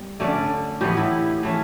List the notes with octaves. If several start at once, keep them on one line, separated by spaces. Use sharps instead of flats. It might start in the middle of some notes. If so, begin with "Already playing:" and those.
Already playing: G3 B3
D3 A3 C#4 D5
A2 E3 B3 G4
E4
E3 A3 C#4